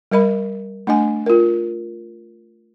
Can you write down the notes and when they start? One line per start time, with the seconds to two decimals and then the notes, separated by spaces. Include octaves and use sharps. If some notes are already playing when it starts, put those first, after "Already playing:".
0.12 G3 A#4 D#5 B5
0.87 A3 D4 D#5 G#5
1.26 F4 A#4